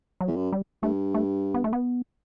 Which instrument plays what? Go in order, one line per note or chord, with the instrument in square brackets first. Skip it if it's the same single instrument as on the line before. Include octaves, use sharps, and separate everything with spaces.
[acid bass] F#3
[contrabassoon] E2
F#2
[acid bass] G3
[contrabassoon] G2 [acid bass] A3
[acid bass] A3
B3
A3
B3